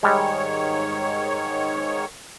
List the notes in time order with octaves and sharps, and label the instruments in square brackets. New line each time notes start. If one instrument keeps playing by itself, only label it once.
[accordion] G#2 D#3 C#5 [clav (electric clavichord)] G3 G#3